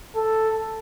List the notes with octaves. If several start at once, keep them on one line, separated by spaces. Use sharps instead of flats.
A4